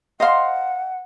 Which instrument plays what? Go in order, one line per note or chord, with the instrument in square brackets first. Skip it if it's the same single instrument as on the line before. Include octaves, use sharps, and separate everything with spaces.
[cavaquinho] C5 A#5 C6 [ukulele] D#5 F5 [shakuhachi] F#5